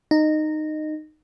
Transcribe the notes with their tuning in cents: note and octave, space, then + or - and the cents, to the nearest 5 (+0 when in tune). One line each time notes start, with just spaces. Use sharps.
D#4 -15